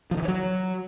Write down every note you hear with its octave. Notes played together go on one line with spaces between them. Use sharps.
F3
D#3
E3
F#3